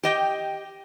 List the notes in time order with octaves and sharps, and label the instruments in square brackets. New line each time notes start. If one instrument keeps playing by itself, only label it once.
[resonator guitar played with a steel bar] G4 D#5 G5